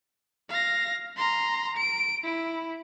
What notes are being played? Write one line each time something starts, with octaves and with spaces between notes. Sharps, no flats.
F5 A#6
A#5 C6
D7
E4